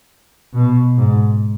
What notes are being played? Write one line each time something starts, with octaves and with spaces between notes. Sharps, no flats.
B2
G#2